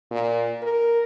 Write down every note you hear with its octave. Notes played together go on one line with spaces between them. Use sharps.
A#2
A#4